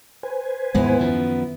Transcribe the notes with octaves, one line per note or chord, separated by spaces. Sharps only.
B4 C5 G#5
D#2 G#2 G#3 B3 E4
F#2 D#3 F3